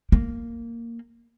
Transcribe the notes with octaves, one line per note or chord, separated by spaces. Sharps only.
A#3